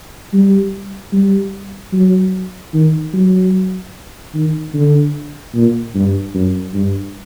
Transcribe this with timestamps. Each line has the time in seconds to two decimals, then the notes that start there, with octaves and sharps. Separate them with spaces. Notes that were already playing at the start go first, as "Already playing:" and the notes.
0.33 G3
1.13 G3
1.93 F#3
2.74 D#3
3.14 F#3
4.34 D#3
4.74 D3
5.54 A#2
5.95 G2
6.34 F#2
6.74 G2